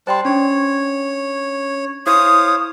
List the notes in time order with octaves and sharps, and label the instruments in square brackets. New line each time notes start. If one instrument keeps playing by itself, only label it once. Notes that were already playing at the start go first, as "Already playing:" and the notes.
[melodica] G3 A5 [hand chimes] C5 G5 C6
[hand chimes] C#4 D4 [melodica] C#5
[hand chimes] E4 [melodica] C5 C#5 F5 [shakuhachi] D#6